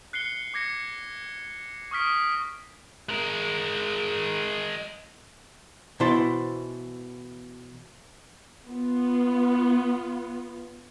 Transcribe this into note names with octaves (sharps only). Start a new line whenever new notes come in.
F#6 C7 C#7 G7
D6 G#6 A#6 C#7
C#6 D#6 F6 B6 D7
G#3 A#4
B2 E3 E4 C5 A5 C6
B3 F4